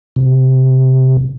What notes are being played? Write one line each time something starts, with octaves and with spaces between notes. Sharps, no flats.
C3